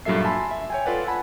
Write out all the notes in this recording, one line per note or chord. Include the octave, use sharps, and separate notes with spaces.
G2 A#2 F#3 A4 E5 C7
G#5 A5 B5 C6
E5
C#5 G5 G#5
F4 A4 B4 D5 F#5
F#5 G#5 A5 B5